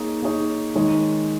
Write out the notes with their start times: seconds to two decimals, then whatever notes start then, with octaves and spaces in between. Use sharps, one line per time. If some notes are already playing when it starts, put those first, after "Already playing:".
Already playing: A#3 D#4 G#4 C#5
0.22 A#3 D#4 G#4 C#5
0.75 D#3 G#3 D#4 C#5